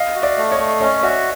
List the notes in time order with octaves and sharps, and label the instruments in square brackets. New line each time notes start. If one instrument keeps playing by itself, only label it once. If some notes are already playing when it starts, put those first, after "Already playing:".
Already playing: [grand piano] D#5 F5
[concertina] F#4
[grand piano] D5 E5
[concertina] A3
[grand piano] C#5 D#5
[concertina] A3
[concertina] C#4 [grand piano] C#5 D#5
[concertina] F#4 [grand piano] D5 E5